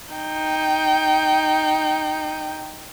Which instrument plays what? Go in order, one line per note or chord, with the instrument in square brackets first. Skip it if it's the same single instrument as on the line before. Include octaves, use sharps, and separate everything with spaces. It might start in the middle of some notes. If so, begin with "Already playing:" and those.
[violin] D#4 G5